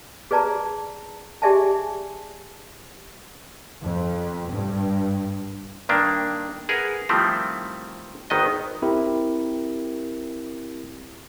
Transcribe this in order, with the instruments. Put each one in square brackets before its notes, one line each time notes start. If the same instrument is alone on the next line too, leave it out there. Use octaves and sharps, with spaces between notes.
[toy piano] G#4 B4 D5 A5 A#5
G4 G#4 D5 E5 G#5 A5
[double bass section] F2
G2
[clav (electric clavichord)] G2 D#3 A#3 D4
G#4 A#4 B4 F#5
D#3 F3 G3 A3 C4 E4
G#1 D#3 B3 D#5
[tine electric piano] C4 E4 G4 A#4